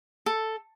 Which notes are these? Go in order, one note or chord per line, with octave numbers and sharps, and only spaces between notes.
A4